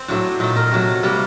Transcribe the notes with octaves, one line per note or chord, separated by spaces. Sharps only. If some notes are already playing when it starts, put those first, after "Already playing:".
Already playing: C4
A2 F#3 A3 D4
A#2 A3 D#4
A#4
C3 F#3 A3
C3 G3 A#3 A4